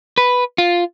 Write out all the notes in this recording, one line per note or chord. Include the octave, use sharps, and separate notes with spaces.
B4
F4